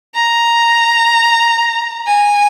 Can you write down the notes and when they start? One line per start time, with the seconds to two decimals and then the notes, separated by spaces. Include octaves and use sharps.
0.15 A#5
2.07 G#5